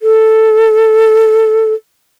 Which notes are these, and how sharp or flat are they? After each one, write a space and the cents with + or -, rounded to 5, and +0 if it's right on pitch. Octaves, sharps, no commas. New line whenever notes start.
A4 +0